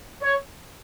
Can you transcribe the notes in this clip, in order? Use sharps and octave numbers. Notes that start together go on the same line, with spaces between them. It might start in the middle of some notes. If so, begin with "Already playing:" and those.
C#5